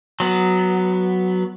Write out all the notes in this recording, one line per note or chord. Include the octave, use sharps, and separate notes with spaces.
F#3 B3